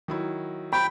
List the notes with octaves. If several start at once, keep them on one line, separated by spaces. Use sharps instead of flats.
D#3 F#3 E4
G5 B5